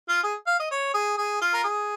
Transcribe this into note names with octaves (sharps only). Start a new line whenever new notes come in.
F4
G#4
F5
D#5
C#5
G#4
G#4
F4
A#4
G#4